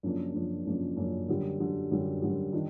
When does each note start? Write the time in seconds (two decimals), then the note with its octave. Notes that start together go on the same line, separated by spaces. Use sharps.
0.03 F#2 C#3 F3 A#3 D4
0.34 F#2 C#3 F3 A#3 D4
0.65 F#2 C#3 F3 A#3 D4
0.97 F#2 C#3 F3 A#3 D4
1.28 F#2 D3 G3
1.60 F#2 D3 G3
1.91 F#2 D3 G3
2.22 F#2 D3 G3
2.53 D#3 G3 D4